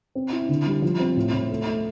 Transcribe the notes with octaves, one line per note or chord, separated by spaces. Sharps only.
C4
E4
D3
G3
F3
C4
A2
A2
A3
A3